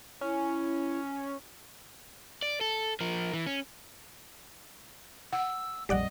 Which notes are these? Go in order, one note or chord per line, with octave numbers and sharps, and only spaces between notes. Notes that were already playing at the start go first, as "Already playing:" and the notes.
C#4 E4
D5
A4
F3 A#4
E3
C#4
F#5 E6
A#1 F2 G3 D5 D#5 F#5